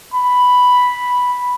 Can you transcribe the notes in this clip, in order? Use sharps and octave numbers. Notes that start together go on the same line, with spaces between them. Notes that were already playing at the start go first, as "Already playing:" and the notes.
B5